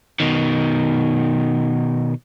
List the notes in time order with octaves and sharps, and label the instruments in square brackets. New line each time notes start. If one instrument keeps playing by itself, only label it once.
[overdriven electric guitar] B2 D#3